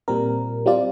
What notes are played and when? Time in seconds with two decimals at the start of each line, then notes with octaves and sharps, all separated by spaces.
0.08 A#2 G3 C4 A#4
0.66 G3 C4 F4 D5